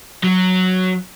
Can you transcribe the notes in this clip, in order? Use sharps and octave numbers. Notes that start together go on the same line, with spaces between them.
F#3